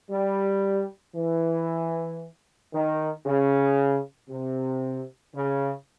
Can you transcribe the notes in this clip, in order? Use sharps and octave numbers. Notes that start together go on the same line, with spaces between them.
G3
E3
D#3
C#3
C3
C#3